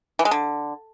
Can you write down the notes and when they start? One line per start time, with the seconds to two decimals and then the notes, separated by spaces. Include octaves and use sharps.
0.19 E3
0.25 G#3
0.31 D3